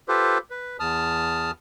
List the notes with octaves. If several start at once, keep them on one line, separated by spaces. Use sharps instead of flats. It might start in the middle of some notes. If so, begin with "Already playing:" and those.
F4 G4 A4 B4 C5
B4
E2 A5 D#6 F6